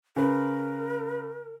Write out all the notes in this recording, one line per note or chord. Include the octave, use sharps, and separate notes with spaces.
C#3 A#4 B4